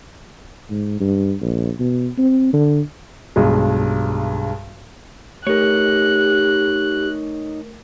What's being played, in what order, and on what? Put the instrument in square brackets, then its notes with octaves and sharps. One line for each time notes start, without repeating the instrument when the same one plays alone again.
[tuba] G#2
G2
A#1
B2
C4
D3
[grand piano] B1 G2 G#3
[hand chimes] A3 A#4 [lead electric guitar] D#4 C#5 [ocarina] G4 [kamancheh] F#6